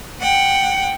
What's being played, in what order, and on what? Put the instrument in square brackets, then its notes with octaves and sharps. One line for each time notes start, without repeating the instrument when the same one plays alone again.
[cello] F#5 G5